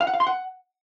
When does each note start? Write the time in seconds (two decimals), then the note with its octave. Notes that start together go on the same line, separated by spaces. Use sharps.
0.01 F5
0.07 F#5
0.14 F5
0.20 C6
0.27 F#5